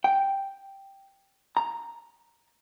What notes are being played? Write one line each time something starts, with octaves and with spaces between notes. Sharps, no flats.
G5
A#5